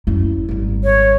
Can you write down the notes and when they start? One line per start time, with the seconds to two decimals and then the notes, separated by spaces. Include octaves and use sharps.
0.07 F#2 E4
0.49 G#1 G3
0.84 C#5